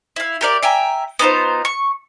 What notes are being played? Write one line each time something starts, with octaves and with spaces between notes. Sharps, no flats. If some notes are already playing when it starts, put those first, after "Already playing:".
E4 F5
G4 A#4 D5
E5 G5 G#5 A#5
B3 D#4 F4 C5
C#6